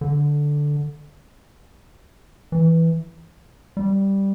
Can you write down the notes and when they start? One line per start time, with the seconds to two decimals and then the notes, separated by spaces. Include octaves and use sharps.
0.01 D3
2.52 E3
3.77 G3